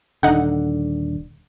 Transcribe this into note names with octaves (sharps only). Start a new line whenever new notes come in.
D#1 D3 D#4 F#5